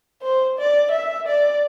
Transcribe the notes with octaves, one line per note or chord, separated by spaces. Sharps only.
C5
D5
E5
D5